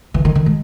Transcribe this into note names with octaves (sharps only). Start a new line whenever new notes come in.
E3
D#3
D#3
G#3